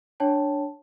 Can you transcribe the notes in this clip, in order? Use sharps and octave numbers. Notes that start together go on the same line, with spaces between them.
D4 C#5 G5 A5